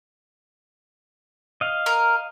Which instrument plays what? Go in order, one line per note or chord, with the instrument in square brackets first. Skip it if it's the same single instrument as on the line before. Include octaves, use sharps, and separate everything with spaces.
[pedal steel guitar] D#5 F5
[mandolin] A#4